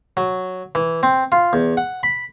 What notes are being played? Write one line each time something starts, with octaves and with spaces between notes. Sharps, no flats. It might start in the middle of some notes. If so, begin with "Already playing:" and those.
F#3
E3
C4
F4
E2
F#5
B5